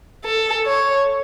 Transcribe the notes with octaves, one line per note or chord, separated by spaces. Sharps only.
A4
C#5